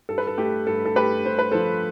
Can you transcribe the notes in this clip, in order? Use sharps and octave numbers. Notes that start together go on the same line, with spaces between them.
G2 A4
B4
A4
A3 G4
G2 A4
A4
A3 G4 B4
G2 C5
B4
F3 A4 C5